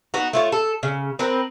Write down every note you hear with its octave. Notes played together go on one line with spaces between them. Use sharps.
B3 D#4 F#4
A3 F4 C#5
A4
C#3
C4 A#4 B4